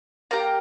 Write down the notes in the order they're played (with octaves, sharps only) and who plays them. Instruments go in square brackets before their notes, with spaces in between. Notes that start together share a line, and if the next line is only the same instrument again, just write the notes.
[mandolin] A#3 G4 A#5